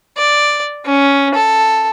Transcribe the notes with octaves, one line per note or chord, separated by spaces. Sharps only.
D5
C#4
A4